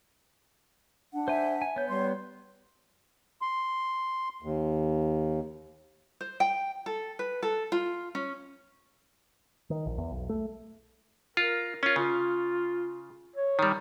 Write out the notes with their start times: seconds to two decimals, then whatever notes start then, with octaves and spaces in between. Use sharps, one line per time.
1.14 D4 F#5
1.28 C5 E5 G#5
1.62 G#5
1.76 B3 C#5 G6
1.89 G3 C#5 C6
3.42 C6
4.42 D#2
6.21 C5
6.40 G5
6.86 A4
7.19 B4
7.43 A4
7.72 F4
8.15 C#4
9.70 D#3
9.86 A#1
9.98 E2
10.11 B1
10.29 A3
11.37 F4 A#4
11.83 C#4 F4
11.96 C#3 F4
13.36 C#5
13.59 D#3 G3